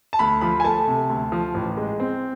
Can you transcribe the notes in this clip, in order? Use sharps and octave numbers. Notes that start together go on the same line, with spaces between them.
A5
D2 B5
F3 B5
G#5
A3 A5
C3
D2
F3
A1
G#3
C4